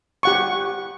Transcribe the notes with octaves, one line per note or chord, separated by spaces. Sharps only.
G4 F#5 C#6